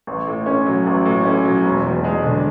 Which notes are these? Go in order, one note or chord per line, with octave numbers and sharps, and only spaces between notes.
A1
A2
C#4
F#3
A1
A2
C#4
F#3
E1
E2
G#3
D3